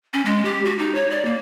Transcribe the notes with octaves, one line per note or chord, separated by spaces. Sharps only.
C#4
G#3
G4
F#4
D#4
C#5
D5
A#3